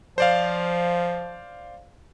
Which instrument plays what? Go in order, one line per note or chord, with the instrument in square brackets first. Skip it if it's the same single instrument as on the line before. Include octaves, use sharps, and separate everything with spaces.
[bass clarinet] F3 [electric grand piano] C5 D5 F5